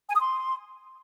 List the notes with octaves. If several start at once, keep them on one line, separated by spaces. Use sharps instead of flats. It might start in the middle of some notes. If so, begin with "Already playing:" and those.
G#5
D#6
C6